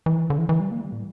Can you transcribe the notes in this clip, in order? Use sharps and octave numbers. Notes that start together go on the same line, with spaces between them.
E3
D3
E3
E3
G3
A#3
G3
A2